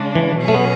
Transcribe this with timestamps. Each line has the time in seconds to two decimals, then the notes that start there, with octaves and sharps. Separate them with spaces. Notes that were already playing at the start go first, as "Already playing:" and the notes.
Already playing: C#3 G#3 D4
0.15 E3
0.38 B2 F#3 C#4 G#4
0.48 A3
0.54 B3